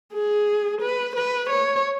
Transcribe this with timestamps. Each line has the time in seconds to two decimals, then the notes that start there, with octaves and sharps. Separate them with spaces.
0.14 G#4
0.81 B4
1.15 B4
1.49 C#5